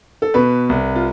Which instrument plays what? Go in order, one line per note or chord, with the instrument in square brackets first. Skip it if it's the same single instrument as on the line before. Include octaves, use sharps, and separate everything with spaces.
[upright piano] A4
[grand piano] B2 [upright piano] B4
[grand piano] C2
[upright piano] F4